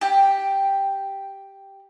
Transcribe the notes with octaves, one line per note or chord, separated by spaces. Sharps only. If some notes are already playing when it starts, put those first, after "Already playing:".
G4 G5